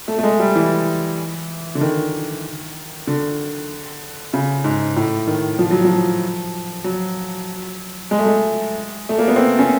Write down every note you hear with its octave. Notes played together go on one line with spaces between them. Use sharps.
A3
A3
G#3
G3
E3
D3
D#3
D3
C#3
G#2
A2
D#3
F3
F#3
F3
F#3
G#3
A3
G#3
A3
A#3
B3
C4
C#4